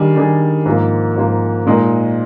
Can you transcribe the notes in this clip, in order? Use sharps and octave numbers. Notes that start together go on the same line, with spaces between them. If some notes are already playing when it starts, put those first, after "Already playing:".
Already playing: D#3 G3 D4 G#4
D#3 G3 D4 G#4
G#2 F3 A#3
G#2 F3 A#3
A#2 G#3 D#4 A#4